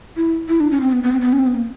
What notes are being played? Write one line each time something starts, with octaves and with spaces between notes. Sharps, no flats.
E4
E4
D4
C#4
C4
B3
B3
C4
B3
C#4
C4
B3
A#3